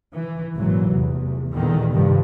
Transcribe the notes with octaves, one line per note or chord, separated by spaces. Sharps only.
E3
G#1 A#2 E3 F#3
F1 E2
E2 A#2 D3 D#3 G3
G2 C3 D#3 F3